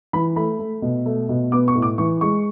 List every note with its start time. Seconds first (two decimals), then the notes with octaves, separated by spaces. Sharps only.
0.13 E3 B5
0.36 A3 B5
0.59 A3
0.82 B2
1.06 A3
1.29 B2
1.52 B3 D6
1.68 C#6
1.75 A2
1.82 D6
1.98 E3 C#6
2.21 G#3 C#6